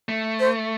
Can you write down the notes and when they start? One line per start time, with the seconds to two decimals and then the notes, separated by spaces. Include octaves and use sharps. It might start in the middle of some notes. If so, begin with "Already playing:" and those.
0.09 A3
0.40 C5